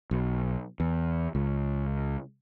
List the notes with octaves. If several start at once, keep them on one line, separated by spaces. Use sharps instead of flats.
B1
E2
C#2